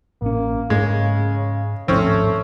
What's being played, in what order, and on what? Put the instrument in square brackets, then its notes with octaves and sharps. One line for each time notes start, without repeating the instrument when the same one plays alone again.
[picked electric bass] A1 C#4 [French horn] A#3
[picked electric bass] G#2 [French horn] C#3 [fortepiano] G#3
[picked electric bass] D1 G#1 F3 [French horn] A3 [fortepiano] C4 C#4